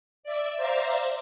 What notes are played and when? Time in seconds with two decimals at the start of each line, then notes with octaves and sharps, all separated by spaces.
0.23 D5 E5
0.57 C5 D5 E5 F5 A#5